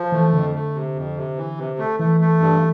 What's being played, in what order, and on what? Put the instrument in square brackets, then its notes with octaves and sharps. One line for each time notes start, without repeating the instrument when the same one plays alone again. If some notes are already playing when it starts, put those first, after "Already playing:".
Already playing: [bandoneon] F3
[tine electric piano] E3 [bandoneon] A3
[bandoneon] F2 [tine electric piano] D3
[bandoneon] A3
C3
F2
C3
E3
C3
A3
[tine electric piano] E3 [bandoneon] A3
[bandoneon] A3
G2